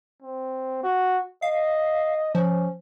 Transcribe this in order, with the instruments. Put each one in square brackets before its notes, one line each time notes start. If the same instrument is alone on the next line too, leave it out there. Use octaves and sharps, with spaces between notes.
[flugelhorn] C4
F#4
[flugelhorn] D#5 [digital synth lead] F5
[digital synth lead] F3 [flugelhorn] C#4